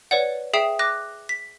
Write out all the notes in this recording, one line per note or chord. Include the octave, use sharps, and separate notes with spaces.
B4 C#5 D5 F#5
G#4 E5 G5 D#6 C7 E7
D6 F#6 A#6
B6